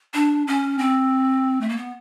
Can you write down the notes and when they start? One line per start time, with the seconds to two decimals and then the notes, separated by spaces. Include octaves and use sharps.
0.14 D4
0.47 C#4
0.79 C4
1.61 A3
1.69 A#3
1.77 B3